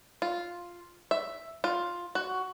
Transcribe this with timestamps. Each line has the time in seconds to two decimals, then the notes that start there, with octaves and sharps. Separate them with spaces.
0.22 F4
1.11 E5
1.64 F4
2.15 F#4